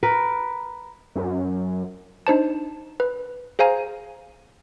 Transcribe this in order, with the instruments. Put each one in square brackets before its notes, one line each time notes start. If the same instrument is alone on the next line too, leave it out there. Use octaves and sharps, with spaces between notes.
[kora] A#4 B4
[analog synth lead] F#2
[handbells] D4 D#4 C5 A5
B4
G#4 C5 F5 G#5 A#5